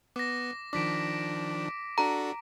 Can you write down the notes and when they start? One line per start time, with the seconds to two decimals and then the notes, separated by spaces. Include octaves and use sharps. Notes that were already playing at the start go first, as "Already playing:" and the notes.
0.16 B3 D6 A#6
0.73 D#3 F3 D4 D6 B6 D7
1.98 D4 F#4 A4 A#5